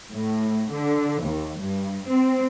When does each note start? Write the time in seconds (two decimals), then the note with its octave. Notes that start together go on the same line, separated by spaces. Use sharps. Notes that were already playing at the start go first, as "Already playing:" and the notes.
0.11 A2
0.71 D3
1.23 D#2
1.59 G2
2.08 C4